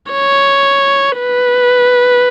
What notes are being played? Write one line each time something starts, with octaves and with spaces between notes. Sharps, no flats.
C#5
B4